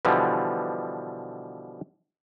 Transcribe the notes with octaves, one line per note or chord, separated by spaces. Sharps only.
B2 D3 E3 F3 G3